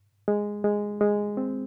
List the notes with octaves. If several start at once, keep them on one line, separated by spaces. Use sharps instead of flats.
G#3
G#3
G#3
C4